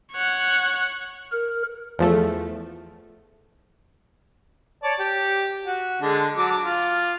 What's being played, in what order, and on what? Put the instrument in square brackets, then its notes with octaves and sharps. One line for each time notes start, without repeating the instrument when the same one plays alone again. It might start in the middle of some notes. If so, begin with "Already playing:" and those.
[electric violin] C#5 F#5
[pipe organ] A#4
[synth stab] E2 F3 A3
[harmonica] C#5 D5 A5
G4
F#4
D3 G#3 D4
F#3 A5 D6
F4